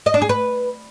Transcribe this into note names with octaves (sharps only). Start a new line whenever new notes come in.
D#5
D4
G#4
B4